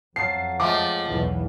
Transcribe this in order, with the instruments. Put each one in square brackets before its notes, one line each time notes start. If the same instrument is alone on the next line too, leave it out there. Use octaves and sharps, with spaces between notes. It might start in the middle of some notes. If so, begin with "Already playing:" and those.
[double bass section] F2 [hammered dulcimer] F#3 F5 A5 [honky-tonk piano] C7
[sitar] F3 G#3 A3 [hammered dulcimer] C#5 F5 G5 [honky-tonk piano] D6
[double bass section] B1 E2 E3